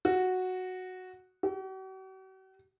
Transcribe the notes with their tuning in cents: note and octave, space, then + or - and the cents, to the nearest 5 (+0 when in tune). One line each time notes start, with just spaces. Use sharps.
F#4 -5
F#4 +45